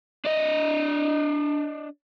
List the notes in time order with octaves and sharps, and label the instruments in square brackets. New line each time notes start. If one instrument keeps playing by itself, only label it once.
[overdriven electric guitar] D4 D#5